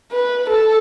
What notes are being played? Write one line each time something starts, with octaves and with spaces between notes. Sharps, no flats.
B4
A4